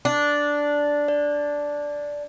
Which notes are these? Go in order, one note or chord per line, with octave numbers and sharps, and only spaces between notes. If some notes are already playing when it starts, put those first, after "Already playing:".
D4
D5